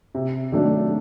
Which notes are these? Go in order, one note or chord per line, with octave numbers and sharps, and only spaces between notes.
C3
D#3 F#3 A3 D4